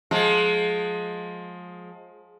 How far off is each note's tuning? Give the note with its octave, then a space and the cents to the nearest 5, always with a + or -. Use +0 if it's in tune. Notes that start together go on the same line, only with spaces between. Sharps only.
F3 +30 G#3 +25